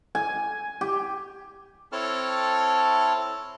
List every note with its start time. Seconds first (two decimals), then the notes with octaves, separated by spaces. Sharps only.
0.15 G#5
0.81 G4
1.92 C4 E4 A4 C#5 A5 F6